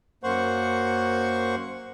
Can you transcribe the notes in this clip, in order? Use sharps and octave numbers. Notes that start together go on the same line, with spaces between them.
F#2 A#3 C5 F#5 C#6